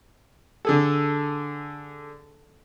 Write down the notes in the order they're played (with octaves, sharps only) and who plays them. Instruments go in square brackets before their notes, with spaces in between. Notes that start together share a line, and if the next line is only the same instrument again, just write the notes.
[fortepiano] D3 G#4 A4